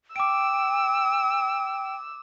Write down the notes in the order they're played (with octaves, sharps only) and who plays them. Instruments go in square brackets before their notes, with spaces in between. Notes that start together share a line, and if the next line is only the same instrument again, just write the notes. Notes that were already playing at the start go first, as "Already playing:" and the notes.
[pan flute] G5 [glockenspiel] D6 D7 [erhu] E6